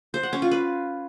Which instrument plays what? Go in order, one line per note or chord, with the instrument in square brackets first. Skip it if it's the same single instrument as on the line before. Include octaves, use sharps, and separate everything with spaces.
[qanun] C5
F#5
C#4
F4
B4